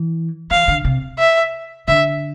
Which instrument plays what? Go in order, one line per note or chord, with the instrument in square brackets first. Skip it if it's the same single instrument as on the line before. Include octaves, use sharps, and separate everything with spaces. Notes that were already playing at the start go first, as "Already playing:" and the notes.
Already playing: [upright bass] E3
[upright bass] E3 [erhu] F5
[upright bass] D3
C3
[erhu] E5
[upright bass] D3 [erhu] E5